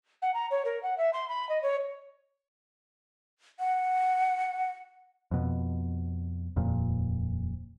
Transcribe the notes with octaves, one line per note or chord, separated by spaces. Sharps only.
F#5
A#5
C#5
A#4
F#5
E5
C6
B5
D#5
C#5
F#5
F2 B2
D#1 F2 A#2